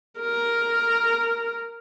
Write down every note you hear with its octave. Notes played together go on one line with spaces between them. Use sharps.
A#4